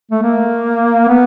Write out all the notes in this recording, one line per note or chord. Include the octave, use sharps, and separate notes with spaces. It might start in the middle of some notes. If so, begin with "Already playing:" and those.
A3
A#3
B3